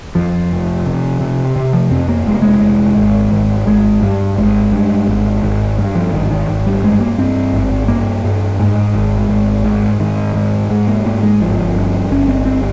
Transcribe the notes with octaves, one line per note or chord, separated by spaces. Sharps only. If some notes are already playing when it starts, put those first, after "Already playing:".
F2 F3
F1
C3
C3
C3
F3
F2 C4
A#3
F1 G#3
A#3
G#3
F1
G#1
G#1
G#1 G#3
G2 G3
G#1 G#3
G2
G#1
G#1
G2
F3
G#1 D#3
D#3
G#1
G3
G2 G#3
A#3
G2 C4
G#1
G2 A#3
G2
G#2 G#3
G#1
G#1
G#2
G#2 D#3
G#2
G#2
A#3
G#2 A#3
G#3
G1 F3
G2
G1 C#4
C4
G2 C4